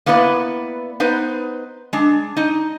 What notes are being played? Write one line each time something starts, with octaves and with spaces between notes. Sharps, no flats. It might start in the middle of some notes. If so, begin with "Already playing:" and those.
A#3 B3 E4 B4 D5
B3 D#4 B4 C5
G#3 D4
D#4 D#5